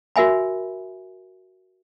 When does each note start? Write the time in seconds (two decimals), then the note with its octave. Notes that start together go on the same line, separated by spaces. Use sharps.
0.16 F#4 A#4 E5 G#5 B5